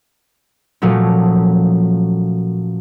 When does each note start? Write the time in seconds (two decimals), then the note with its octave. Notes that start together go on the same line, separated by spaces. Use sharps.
0.82 A#2 F3 F#3 A3 C#4